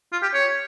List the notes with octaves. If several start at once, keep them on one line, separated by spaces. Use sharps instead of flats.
F4
G4
C#5